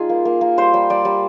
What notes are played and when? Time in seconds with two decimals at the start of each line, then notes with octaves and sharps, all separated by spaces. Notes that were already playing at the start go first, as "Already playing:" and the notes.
Already playing: G3 D#4 F4 G#4
0.09 A#3
0.25 A#3
0.41 A#3
0.57 G3 C5
0.74 G3
0.90 G3 D5
1.05 G3